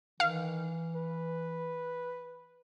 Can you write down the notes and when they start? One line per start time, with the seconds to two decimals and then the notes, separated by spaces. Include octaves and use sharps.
0.20 D#3 E3 F5
0.96 B4